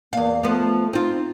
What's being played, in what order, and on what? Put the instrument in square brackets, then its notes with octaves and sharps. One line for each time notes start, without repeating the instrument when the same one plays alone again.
[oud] E2 F5 [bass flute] A#3
[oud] F3 B3 [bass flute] A3
[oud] C4 F4 [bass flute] D#4